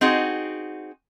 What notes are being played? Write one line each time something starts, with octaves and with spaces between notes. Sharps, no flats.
C4 D#4 F#4 G#4